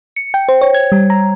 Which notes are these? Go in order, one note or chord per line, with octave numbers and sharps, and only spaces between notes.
C#7
G5
C5
C#5
G#6
G3
A#5